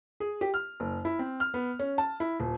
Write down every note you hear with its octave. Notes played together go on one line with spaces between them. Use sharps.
G#4
G4
F6
F#1
E4
C4
F6
B3
C#4
A5
E4
D#1